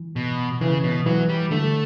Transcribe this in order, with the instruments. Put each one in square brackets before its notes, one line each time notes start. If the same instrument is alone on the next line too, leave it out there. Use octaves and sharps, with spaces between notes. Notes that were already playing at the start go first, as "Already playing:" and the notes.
Already playing: [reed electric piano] E3
[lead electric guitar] B2
[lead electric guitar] C#3 [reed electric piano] E3
[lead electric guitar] B2
[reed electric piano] E3 [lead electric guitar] F#3
[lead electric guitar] G3
[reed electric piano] D3 [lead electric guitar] A3